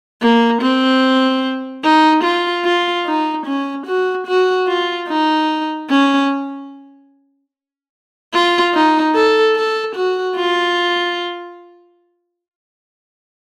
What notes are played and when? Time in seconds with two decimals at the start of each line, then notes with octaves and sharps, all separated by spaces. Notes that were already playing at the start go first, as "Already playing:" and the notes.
0.22 A#3
0.62 C4
1.84 D#4
2.24 F4
2.65 F4
3.06 D#4
3.46 C#4
3.87 F#4
4.27 F#4
4.68 F4
5.08 D#4
5.91 C#4
8.33 F4
8.74 D#4
9.15 A4
9.56 A4
9.96 F#4
10.36 F4